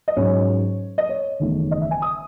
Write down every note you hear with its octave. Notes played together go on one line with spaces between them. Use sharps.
D#5
G#2 F#3 C#4 C#5
D#5
C#5
F#1 E2 D#3 A3 D#4
D#5
E5
G#5
D#6